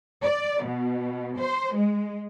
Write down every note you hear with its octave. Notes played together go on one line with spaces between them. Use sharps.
D5
B2
C5
G#3